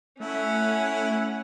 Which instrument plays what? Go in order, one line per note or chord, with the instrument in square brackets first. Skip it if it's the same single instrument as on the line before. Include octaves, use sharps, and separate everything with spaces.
[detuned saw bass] A3 [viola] C#4 F#5 [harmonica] E4